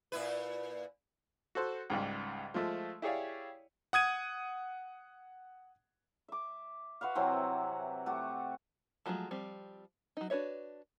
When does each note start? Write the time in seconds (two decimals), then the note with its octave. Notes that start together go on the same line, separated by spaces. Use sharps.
0.12 A#2 E4 B4
1.55 F#4 A4 C5
1.90 C#2 G#2 G3
2.54 F3 G#3 A3
3.02 E4 G4 G#4 C#5 D5 F5
3.93 F#5 D#6 G#6 D#7
6.28 E5 D6
7.01 F#4 B4 E5 F5
7.15 C3 E3 F#3 C4
8.06 A3 F#4 G4
9.06 F3 F#3 G#3 A3 F4
9.31 F3 G3 C4
10.17 F#3 D#4
10.30 D4 F#4 B4 C#5 E5